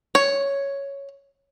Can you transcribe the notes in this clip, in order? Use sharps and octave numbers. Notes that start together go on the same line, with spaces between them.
C#5